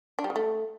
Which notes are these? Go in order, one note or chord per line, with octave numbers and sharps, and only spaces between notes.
D4
G3
C#3
A3